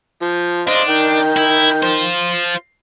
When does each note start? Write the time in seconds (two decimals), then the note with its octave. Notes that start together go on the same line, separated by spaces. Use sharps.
0.22 F3
0.68 D4 C5 D#5 F5
0.89 D#3 G5
1.37 E4
1.82 F4 C5